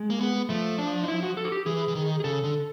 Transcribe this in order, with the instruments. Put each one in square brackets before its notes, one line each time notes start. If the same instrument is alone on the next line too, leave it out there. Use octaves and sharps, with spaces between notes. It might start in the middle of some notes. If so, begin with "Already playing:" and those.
Already playing: [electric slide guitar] G#3
[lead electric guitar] A#3
B3
[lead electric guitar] F3 [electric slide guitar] A3
[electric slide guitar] D4
D#4
E4
F#4
A4
F#4
G4
[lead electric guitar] E3 [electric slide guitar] G#4
[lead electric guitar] E3
D#3
[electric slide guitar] G#4
[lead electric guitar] C#3 [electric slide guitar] A4
[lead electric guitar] D3